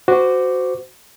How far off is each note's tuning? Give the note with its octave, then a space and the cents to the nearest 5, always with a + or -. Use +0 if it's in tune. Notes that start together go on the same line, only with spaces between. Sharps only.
F#4 +0 C5 -25 D6 +0